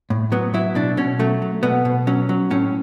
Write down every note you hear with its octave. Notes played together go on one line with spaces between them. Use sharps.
A2
F#3 B3
F#3 E4
B2 D4
B2 C#4
F#3 A3
F#3
B2 B3
B2
F#3 C#4
F#3
A2 C#4